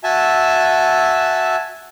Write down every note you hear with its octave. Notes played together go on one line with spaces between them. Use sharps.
F#4 E5 G#5 A5 E6